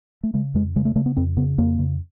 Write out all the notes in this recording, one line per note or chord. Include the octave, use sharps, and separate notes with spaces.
A3
C#3 G#3
F2 G#3
C#3 G#3
A3
C#3 A3
B3
F2 C4
C#3 B3
F2 A#3
C#3